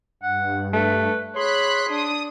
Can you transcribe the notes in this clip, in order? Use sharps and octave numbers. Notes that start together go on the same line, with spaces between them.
G2 F#5
A3 B4
G#4 C#5 B5 C6 F#6
D4 D#6